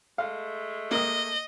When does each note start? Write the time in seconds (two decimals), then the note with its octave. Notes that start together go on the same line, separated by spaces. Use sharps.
0.18 G#3 A3 F5
0.91 A#3 D#5 D#6